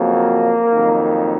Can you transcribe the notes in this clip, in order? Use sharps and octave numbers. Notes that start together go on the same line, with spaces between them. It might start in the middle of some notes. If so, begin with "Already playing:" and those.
Already playing: F2 C#3 F#3 A#3
F2 D#3 F#3